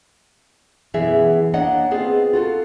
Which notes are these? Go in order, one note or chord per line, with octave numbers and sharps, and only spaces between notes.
F#2 B2 E3 B3 G#4 E5
A#3 D4 C#5 D#5 F#5
B3 C4 F4 G#4
F4 F#4 A4